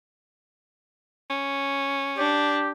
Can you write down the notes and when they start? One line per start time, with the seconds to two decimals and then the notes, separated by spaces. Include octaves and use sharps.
1.30 C#4
2.18 D4 G4